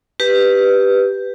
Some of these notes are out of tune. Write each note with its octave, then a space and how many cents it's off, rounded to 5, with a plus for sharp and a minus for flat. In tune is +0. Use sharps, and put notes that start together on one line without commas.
G4 +0 B4 +0